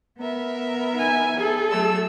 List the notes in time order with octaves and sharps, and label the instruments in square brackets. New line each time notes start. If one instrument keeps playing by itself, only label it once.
[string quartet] B3 A#4 E5
[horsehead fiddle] D#4 G#5
G#4 A4
[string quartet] F#3 A3 E6